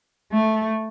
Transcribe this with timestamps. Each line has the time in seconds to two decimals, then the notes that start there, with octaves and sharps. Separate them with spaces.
0.32 A3